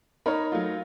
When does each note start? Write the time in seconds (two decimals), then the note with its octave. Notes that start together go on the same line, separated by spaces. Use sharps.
0.26 D#4 A#4 C#5 B5
0.52 F#3 A3 F4